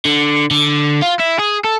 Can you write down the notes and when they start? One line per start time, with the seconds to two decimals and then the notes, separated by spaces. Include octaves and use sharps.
0.05 D3
0.51 D3
1.02 F4
1.20 E4
1.39 G#4
1.65 A4